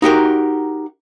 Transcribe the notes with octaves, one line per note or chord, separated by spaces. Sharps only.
D#4 F#4 G4 A#4